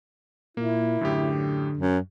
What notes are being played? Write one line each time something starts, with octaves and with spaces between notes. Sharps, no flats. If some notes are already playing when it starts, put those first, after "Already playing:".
A#2 A#3 E4
F#2 A2 D3 G4
F#2